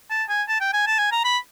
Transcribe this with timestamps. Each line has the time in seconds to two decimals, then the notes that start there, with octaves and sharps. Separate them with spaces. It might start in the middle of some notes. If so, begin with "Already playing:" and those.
0.10 A5
0.29 G#5
0.48 A5
0.61 G5
0.73 G#5
0.87 A5
0.99 G#5
1.12 A#5
1.24 B5